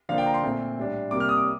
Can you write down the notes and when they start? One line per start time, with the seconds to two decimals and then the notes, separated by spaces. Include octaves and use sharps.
0.09 D3 F3 A#3 D4 F5
0.18 G5
0.26 A#5
0.34 C6
0.43 A#2 A3 C4
0.78 A2 G3 D4
1.11 C3 G3 A#3 D6
1.20 F6
1.29 D#6
1.37 D6